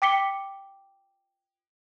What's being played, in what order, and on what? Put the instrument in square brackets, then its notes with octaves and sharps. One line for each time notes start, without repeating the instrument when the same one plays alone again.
[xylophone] G5 D6 B6 C#7 G7